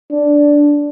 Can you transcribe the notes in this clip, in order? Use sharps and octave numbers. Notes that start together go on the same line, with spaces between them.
D4